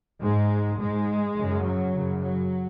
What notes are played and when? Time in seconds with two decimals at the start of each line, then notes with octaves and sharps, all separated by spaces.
0.22 G#2 G#3
0.79 G#2 G#3
1.36 F#2 C#3
1.65 F#3
1.93 F#2 C#3
2.22 F#3